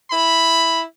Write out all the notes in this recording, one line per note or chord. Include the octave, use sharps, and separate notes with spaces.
E4 B5